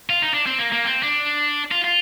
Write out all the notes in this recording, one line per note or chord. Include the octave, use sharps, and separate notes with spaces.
F4
D#4
D4
C4
A#3
A#3
C4
D4
F4
F4